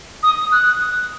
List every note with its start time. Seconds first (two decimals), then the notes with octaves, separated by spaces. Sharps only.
0.23 D#6
0.52 F#6